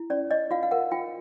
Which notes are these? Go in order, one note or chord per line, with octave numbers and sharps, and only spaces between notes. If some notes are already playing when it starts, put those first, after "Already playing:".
Already playing: E4
C#4 D5
C#5 D#5
F4 F5
F5
A#4 F#5
F4 G5